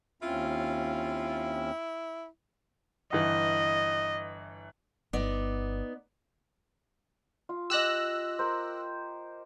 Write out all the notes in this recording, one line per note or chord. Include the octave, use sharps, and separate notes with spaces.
D#2 C4 C#4 E4 F4
G1 E3 D#5
G1 B3 D#4 D5
F4
G4 D#5 E6 F#6 A#6
A#4 C5